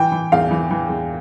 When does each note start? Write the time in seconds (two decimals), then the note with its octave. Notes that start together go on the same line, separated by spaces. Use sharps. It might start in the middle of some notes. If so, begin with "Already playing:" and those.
Already playing: E3 G5
0.12 E3
0.32 E2 F5
0.51 E3
0.70 E3
0.89 E2